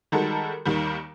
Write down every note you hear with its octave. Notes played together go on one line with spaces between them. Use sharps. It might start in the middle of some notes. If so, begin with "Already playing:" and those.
D#3 G3 G#3 F#4 A4 A#4
D#2 D#3 G3